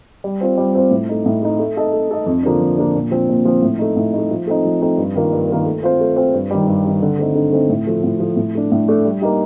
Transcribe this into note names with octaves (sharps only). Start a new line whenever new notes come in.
G3
C4 F4 C5
G3
C4 F4 C5
A2
A3 D#4
A2
A3 D#4
A3
D#4 A4 D#5
A3
D#4 A4 D#5
F2
D3 F3 A#3 D4
F2
D3 F3 A#3 D4
A#2
F3 C4
A#2
F3 C4
A2
A3 D#4
A2
A3 D#4
F3
A3 C4 D#4
F3
A3 C4 D#4
G2
D#3 A#3 F4 A#4
G2
D#3 A#3 F4 A#4
A3
C4 F4 C5
A3
C4 F4 C5
G2
D#3 G3
G2
D#3 G3
D3
A3 C4 D#4
D3
A3 C4 D#4
A2
F3 A3
A2
F3 A3
A2
A3 D4
A2
A3 D4
G3
A#3 D#4 G4